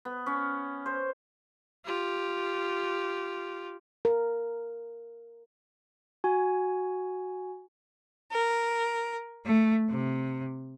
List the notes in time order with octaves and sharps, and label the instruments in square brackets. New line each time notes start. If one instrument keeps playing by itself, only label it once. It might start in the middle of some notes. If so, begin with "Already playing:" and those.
[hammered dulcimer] B3
C#4
C5
[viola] F4 G4
[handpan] A#4
[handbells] F#4 G#5
[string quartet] A#4
A3
C3